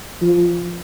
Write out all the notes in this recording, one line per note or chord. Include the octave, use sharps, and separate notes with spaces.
F3